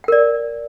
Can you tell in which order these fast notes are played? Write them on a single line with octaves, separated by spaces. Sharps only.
G5 A#4 D5